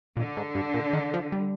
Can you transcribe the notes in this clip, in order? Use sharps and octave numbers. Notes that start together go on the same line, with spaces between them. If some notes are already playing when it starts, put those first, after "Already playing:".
A#2 D3
G#2
G2
A#2
D#3
F3
G3